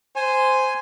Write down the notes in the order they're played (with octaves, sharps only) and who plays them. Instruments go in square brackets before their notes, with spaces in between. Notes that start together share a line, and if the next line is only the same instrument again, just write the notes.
[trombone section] C5 [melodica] G#5